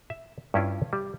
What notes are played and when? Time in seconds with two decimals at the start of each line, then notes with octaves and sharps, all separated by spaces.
0.10 E5
0.54 G2 C#4 E4 F4
0.93 G3